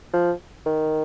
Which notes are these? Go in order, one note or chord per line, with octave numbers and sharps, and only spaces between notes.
F3
D#3